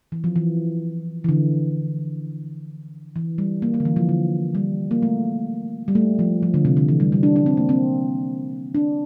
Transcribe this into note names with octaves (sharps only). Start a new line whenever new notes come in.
E3
F3
E3
E3
D3
E3
G3
A#3
A#3
D3
E3
F3
D3
G3
A#3
A3
G3
A3
F3
F3
D3
C3
D3
E3
G3
G3
D4
D4
C4
A#3
C4
D4